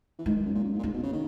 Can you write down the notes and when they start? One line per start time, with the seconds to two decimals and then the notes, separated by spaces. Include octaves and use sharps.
0.19 E3
0.26 D#3 G#3
0.36 D#3
0.45 F#2
0.55 A#2
0.64 F#2
0.73 G#2
0.79 A#2
0.83 G#2 A#3
0.94 B2
1.03 C#3
1.13 D#3